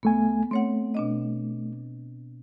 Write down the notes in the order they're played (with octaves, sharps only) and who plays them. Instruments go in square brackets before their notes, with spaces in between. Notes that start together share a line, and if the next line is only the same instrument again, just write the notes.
[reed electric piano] C2 A3 G#5 [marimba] B3
[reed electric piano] A3 [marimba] C4 C#5 F#5
[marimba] B2 D4 D#5